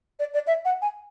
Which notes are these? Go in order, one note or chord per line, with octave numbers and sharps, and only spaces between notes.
D5
D5
E5
F#5
G#5